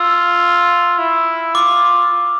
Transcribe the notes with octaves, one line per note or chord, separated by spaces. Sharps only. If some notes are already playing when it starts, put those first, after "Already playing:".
Already playing: F4 E6
E4
F4 D6